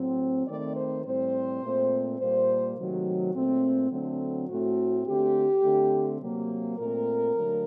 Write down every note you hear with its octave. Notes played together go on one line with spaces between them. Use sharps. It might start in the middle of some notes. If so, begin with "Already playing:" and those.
Already playing: A2 F#3 C4
D#3 A3 C4 D5
C5
A2 G3 C4 C5
A#2 A3 C4
A#2 G3 A#3 C5
C3 D#3 F#3 A3
A#2 A3 C4
D3 F#3 A3 C4
A2 A3 C4 F#4
D3 A3 C4 G4
D3 A3 C4
C3 F#3 A#3
A#2 A3 C4 A#4
D3 F#3 A3